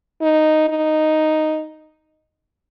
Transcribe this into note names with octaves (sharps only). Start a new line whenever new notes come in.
D#4
D#4